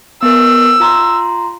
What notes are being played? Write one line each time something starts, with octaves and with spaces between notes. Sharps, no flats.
B3 A#4 E6
F4 A#5 C6